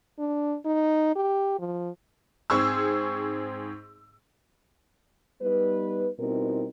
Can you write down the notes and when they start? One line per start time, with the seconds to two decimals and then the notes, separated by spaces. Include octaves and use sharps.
0.19 D4
0.65 D#4
1.16 G4
1.59 F3
2.50 G#2 C4 G#4 C#6 E6
5.41 G3 B3 D#4 B4
6.19 B2 G3 C4 D#4 E4 A#4